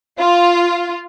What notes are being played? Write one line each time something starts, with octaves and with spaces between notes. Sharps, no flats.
F4